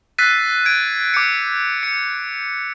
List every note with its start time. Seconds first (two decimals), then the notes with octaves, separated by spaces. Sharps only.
0.18 E6 F#6 A6 B6 C7 D#7
0.65 G#6 D7
1.14 D6 G6 C#7
1.83 C#7